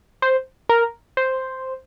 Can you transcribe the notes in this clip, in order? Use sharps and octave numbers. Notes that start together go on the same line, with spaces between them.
C5
A#4
C5